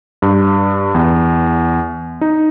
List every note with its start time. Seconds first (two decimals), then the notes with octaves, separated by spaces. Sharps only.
0.22 G2
0.94 E2
2.21 D#4